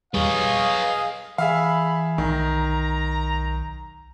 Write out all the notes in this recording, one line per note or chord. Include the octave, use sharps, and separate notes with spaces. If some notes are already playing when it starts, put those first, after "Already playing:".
E2 G3 G#4 B4 C#5 D#5 F5
E3 G#4 E5 F5 B5
B1 D#3 A#5